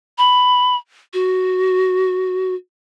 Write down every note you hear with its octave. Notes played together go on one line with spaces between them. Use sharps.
B5
F#4